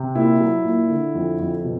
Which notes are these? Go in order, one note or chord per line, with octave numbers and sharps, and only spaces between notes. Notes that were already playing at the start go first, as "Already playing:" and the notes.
Already playing: C3
A#2 E4
F#3
A#2
D3
F2
F2
B2